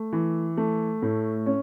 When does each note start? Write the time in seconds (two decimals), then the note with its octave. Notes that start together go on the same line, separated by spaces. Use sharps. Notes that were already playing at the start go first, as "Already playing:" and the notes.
Already playing: A3
0.13 E3
0.57 A3
1.02 A2
1.46 C#4